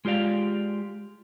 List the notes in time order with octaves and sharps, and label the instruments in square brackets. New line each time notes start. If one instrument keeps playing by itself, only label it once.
[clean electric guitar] G#3 F4 G4 D5 F5